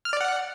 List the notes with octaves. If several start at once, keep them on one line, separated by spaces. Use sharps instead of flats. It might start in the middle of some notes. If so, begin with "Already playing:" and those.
F6
D5
F#5